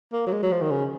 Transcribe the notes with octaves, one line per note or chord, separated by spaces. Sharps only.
A#3
F#3
G#3
F#3
F3
D#3
C#3